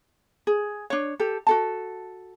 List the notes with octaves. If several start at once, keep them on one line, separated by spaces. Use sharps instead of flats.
G#4
D4 C#5
G4 A4
F#4 A4 A5